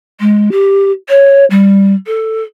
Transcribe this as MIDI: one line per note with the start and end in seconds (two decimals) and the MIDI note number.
0.20 0.49 56
0.51 0.91 67
1.09 1.45 73
1.50 1.95 55
2.07 2.43 69